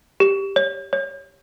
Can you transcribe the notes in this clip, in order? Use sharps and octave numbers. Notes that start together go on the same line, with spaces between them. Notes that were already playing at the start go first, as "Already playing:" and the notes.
G4
C#5
C#5